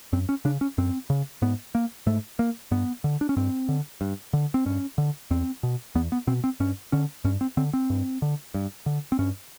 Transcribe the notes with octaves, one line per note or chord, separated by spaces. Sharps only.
F#2 C4
C#4
C#3 D4
C#4
F#2 C4
C#3
G#2 B3
A#3
G#2 A3
A#3
G2 B3
D3
D4
C#4
G2 C4
D3
G2
D3
C4
G2 C#4
D3
E2 C4
B2
E2 B3
B3
B2 C4
C4
G2 C#4
D3 C#4
G2 C#4
C4
D3 C4
C4
G2
D3
G2
D3
C4
G2 C#4